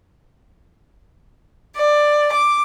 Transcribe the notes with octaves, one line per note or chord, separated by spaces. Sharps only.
D5
D6